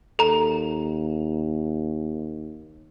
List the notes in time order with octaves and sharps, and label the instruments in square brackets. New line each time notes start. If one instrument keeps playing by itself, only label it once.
[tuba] D#2 [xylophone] A4 A#5